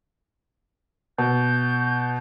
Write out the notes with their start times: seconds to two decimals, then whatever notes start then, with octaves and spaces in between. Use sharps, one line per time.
1.18 B2 G6